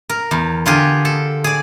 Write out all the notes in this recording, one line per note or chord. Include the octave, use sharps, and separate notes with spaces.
A#4
E2
D3 F4 G4 G#4
A4
G#4 D5